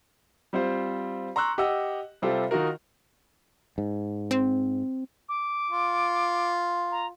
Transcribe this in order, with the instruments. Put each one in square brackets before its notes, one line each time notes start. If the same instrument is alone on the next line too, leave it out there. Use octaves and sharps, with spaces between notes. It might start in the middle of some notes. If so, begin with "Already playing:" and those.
[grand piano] G3 C4 F4 C5
A#5 C6 C#6 E6 F#6
G4 D#5 F#5 E6
C3 G3 C4 F4 G4 A4
D#3 D#4 F4 F#4 A#4
[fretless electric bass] G#2
[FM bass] C4
[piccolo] D6
[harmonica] F4
[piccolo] A#5